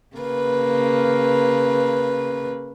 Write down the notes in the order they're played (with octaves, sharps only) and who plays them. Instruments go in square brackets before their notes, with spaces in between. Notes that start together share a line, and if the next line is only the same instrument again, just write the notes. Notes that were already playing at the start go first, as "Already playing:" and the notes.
[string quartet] C#3 A#3 B4